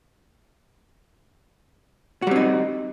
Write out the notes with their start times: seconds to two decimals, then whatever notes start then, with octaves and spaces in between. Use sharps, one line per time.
2.22 F#4
2.27 G3
2.31 C4
2.36 D#4